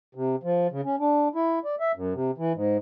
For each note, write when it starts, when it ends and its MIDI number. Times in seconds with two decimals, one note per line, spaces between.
0.15 0.36 48
0.43 0.67 53
0.71 0.81 49
0.84 0.96 61
0.99 1.28 62
1.35 1.59 64
1.65 1.75 74
1.80 1.92 76
1.95 2.14 42
2.14 2.31 48
2.38 2.53 52
2.54 2.77 44